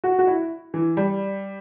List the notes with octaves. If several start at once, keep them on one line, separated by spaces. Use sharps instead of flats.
F#4
F#4
E4
E3
G3